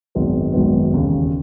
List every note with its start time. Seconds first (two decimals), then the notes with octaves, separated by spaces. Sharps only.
0.15 G#1 F#2 D#3 G#3 B3
0.54 G#1 F#2 D#3 G#3 B3
0.93 E1 D#2 C#3